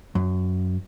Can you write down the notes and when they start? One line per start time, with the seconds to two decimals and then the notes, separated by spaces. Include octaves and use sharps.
0.15 F#2